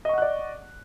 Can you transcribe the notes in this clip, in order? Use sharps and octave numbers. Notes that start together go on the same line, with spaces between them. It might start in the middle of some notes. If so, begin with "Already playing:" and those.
D5 D#5 F#5 C#6 F#6